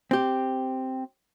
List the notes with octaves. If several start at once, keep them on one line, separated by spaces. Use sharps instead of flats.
C4 G4